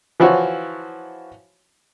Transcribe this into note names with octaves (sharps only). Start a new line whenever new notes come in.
E3 F3 E4 F#4 C#5